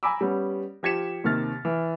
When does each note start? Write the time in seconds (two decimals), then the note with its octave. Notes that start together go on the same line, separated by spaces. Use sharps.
0.03 G#5 A#5 B5 D6 E6
0.21 G3 B3 C#4
0.83 F3 G4 G#6 B6 C#7 E7
1.24 D#2 C3 D#3 F6 A6
1.65 E3